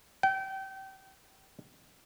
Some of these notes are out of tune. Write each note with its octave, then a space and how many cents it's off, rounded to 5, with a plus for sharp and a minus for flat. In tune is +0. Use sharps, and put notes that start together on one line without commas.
G5 -30